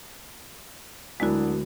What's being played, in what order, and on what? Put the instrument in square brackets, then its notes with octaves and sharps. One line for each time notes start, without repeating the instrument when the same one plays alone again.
[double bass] D2 [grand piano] F#3 D4 [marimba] G#3 F#4 [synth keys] B3 E4 A#4